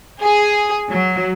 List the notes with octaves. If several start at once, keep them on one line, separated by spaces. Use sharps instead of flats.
G#4
F#3